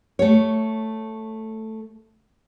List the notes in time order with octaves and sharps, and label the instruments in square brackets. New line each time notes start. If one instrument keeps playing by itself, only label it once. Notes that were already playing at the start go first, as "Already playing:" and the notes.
[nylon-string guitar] A3 C#5